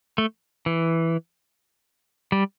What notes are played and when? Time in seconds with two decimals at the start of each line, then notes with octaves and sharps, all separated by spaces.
0.18 A3
0.66 E3
2.32 G3